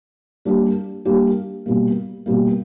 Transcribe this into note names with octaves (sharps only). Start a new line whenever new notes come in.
G3 A#3 D4 G4
G3 A#3 D4 G4
B2 G3 A#3
B2 G3 A#3